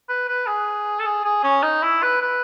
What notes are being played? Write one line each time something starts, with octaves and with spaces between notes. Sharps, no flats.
B4
B4
G#4
A4
G#4
G#4
C#4
D#4
E4
B4
B4